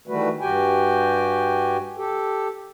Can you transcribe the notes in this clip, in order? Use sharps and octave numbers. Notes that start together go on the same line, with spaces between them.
D#3 E3 G3 A3 F#4 B4
G2 F#4 G4 G5 G#5
G4 A4